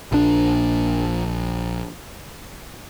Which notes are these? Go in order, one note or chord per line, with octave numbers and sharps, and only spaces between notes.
A#1 D4